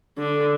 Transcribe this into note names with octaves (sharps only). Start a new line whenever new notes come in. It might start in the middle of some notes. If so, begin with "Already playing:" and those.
D3